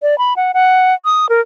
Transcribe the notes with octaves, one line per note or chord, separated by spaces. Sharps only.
D5
B5
F#5
F#5
D#6
A#4